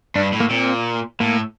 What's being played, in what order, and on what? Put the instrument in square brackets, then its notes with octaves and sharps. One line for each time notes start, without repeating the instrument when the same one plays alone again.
[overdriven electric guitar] G2 [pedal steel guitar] D4
[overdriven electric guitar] A2
[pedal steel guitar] A#3
[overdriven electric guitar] A#2 [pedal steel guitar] C4
[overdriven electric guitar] A2 [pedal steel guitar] A#3